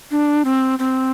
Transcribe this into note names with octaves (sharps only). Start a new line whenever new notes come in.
D4
C4
C4